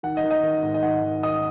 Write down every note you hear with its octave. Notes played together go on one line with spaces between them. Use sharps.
D#3 F#5
D#5
D#3
D#5
D#3
G#2
D#5
D#3 F#5
D#3
D#3 D#5 D#6